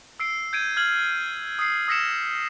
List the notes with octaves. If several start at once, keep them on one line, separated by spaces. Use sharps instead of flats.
E6 C7 D7
G6 G#6 D7 D#7
F6 G#6 F#7
D#6 C7
D#6 E6 A#6 B6 C#7 E7